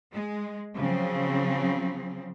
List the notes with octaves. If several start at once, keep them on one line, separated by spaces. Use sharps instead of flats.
G#3
C#3 F3 F#3 C4